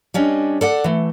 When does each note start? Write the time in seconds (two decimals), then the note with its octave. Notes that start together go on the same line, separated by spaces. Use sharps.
0.14 G3 C#4 D4 D#5
0.61 A4 D5 F#5
0.84 E3 A3